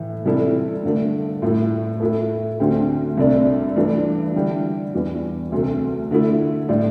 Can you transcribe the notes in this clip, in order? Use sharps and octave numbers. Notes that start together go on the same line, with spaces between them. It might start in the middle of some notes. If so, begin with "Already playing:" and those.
Already playing: A2 E3
C3 G3 E4 A4
G2 D3 A3
A2 A3 E4
A2 A3 E4 A4
D2 D3 C4 G4
C2 C3 A3 D4
G2 E3 A3 D4
D3 G3 E4 G4
E2 E3 G3 D4
D2 C3 A3
D3 A3 E4
A2 G3 D4